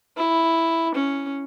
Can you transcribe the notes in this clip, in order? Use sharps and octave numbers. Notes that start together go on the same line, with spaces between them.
E4
C#4